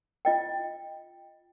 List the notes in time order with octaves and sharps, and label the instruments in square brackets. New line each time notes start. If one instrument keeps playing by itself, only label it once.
[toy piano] F4 D#5 G5